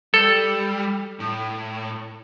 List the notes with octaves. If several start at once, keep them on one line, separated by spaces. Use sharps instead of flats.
G3 A4
A2